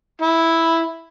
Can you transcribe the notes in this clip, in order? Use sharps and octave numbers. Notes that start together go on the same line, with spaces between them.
E4